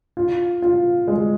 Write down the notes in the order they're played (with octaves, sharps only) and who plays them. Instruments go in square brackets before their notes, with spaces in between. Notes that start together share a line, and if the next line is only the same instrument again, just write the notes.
[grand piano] F4
F4
G#3